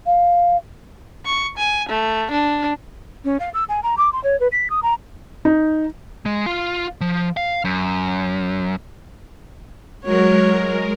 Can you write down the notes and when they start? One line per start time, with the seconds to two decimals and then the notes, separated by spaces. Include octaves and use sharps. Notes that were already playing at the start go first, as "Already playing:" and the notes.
0.06 F5
1.26 C#6
1.58 G#5
1.89 A3
2.31 D4
3.25 C#4
3.40 F5
3.54 E6
3.69 G#5
3.83 A#5
3.98 D6
4.13 C6
4.24 C#5
4.40 B4
4.52 B6
4.70 D#6
4.83 A#5
5.45 D#4
6.26 G#3
6.46 F4
7.01 F3
7.37 F5
7.65 F#2
10.05 F#3 G#3 F#4 A#4 C#5